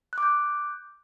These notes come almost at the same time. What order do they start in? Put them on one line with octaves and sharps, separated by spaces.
F#6 D6 G6